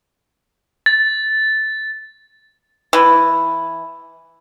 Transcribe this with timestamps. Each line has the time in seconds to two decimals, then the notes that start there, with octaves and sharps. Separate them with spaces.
0.86 A6
2.93 E3